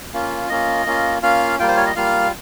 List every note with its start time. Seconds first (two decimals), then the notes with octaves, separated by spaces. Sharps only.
0.13 A#3 C#4 F4
0.49 A#3 C#4 F4 D#5
0.86 A#3 C#4 F4
1.22 A#3 C#4 F4 F5
1.59 G3 A#3 F4 G5
1.68 C5
1.77 C#5
1.86 D#5
1.96 G3 A#3 F4 F5